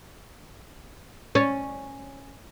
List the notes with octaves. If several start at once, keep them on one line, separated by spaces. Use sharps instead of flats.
C#4